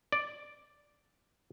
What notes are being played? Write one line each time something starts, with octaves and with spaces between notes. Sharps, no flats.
D5